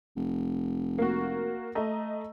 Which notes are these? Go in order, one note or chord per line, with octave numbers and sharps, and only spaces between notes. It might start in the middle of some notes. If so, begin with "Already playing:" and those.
F1
A#3 F#4
A3 D#5 A#5